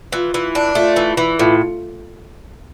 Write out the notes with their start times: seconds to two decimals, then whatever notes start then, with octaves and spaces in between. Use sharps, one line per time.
0.12 E3 F4
0.34 E3
0.55 D4
0.75 A3 F4
0.96 E3
1.17 E3
1.38 A2 F4